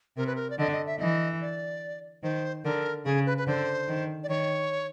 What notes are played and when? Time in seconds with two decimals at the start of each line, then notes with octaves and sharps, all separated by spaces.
0.17 C3 A#4
0.27 B4
0.36 A#4
0.50 D5
0.58 D3 D#5
0.72 D#5
0.86 E5
1.00 E3 D#5
1.41 D5
2.23 D#3 C5
2.64 D3 A#4
3.05 C#3 G#4
3.26 B4
3.38 B4
3.47 D3 C5
3.88 D#3
4.23 D5
4.29 D#3 C#5